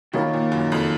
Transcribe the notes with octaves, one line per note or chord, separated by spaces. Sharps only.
B2 D#3 A#3 F4 A#4 C#5
A#2
F#2
F2